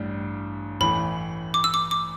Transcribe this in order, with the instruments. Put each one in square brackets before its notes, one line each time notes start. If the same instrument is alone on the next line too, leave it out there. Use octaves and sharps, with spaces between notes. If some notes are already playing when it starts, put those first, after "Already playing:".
Already playing: [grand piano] A1 G2 G3
[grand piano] A1 A2 E3 [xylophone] B5
[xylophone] D6
E6
D6
D6